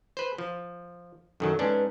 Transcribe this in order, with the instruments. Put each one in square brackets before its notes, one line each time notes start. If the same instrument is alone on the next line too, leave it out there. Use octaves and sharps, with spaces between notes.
[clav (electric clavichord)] B4 C5
F3
[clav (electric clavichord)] F#2 D#3 F#3 [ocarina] A4
[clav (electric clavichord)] G#2 C#4 D4 [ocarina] B4